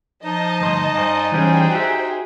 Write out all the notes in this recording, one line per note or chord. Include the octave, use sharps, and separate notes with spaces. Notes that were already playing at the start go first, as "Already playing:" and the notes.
F3 D#4 D#5 A5
D2 G2 C5
G2 C5 D5 F5 G#5
E3 G3 C#4 G#4 C5 G5
F#4 G4 E5